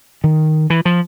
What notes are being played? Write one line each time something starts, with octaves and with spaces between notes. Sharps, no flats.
D#3
E3
F3